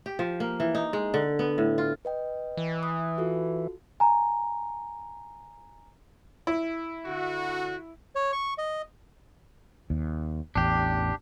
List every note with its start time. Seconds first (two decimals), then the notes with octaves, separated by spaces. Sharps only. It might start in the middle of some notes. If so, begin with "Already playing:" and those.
0.06 G4
0.19 F3
0.40 A#3
0.60 E3
0.75 D#4
0.93 G#3
1.14 D3
1.39 B3
1.58 A2
1.78 F4
2.05 B4 D#5 G5
2.57 E3
2.83 D#6 F#6
3.18 F4 F#4 A4
4.00 G#5 A#5
6.47 E4
7.06 D3 F#4
8.15 C#5
8.32 C#6
8.58 D#5
9.90 D#2
10.55 A1 E2 D4 G4